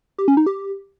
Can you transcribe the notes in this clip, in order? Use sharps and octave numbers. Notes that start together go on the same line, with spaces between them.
G4
C#4
D#4
G4